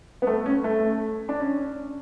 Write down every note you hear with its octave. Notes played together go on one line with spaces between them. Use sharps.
B3
A3
C#4
A3
D4
C#4